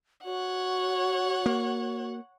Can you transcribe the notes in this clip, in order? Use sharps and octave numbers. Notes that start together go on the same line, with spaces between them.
F#4 C#5 F#5
A#3